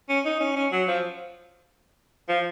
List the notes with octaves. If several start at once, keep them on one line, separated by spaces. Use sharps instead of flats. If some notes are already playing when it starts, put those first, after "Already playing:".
C#4
D#4
C#4
C#4
F#3
F3
F3